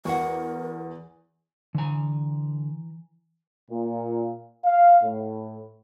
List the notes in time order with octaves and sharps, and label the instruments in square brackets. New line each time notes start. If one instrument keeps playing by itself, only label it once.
[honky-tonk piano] E2 [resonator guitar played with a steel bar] F#4 F#5 [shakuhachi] A#4
[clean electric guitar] D3 G#5 [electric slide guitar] E3 A#5
[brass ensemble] A#2
F5
A2